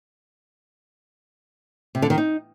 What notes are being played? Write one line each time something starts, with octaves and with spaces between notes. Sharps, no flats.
C3
D3
D#3
D#4